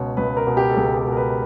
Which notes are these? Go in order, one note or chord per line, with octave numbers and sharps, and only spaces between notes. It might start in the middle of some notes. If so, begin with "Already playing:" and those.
Already playing: C#2 B2 C#5
C#2 B4
A#4
B2
G4
A4
C#2 G#4
G4
B2
A#4
B4